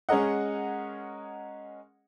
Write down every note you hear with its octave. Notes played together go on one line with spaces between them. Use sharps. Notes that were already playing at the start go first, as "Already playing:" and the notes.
G#3 C#4 G#4 A#4 D#5 F#5